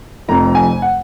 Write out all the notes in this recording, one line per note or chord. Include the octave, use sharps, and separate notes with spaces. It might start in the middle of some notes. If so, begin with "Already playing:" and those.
F1 F2 F3 A#5
G#5
F#5